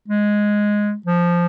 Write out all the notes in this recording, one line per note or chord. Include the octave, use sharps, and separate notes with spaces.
G#3
F3